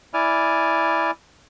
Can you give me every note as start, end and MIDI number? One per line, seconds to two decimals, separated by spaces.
0.14 1.11 64
0.14 1.11 74
0.14 1.11 80
0.14 1.11 89